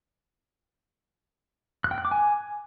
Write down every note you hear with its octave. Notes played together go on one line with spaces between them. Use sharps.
F#6
G5
F#6
D6
G#5